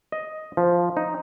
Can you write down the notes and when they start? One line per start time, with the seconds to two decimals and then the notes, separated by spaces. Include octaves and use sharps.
0.12 D#5
0.57 F3
0.97 D#4